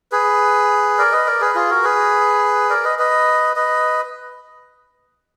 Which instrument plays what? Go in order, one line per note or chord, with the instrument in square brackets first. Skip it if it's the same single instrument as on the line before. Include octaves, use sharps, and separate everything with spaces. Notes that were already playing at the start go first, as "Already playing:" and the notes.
[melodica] G#4 B4
A#4 D5
B4 D#5
A#4 D5
G#4 B4
F4 G#4
F#4 A#4
G#4 B4
A#4 D5
B4 D#5
B4 D#5
B4 D#5